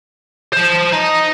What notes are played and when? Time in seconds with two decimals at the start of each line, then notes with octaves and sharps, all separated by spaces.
0.53 C5 A5
0.92 D#4